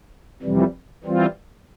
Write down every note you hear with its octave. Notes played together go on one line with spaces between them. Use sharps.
F2 C3 E3 G3
E3 G3 C4 F4